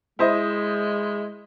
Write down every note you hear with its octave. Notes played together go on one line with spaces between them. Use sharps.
G#3 E4 C5 D#5